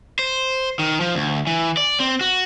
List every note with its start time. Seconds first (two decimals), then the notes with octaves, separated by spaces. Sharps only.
0.19 C5
0.79 D#3
1.01 F3
1.15 D2
1.47 E3
1.77 D5
2.00 C4
2.21 F#4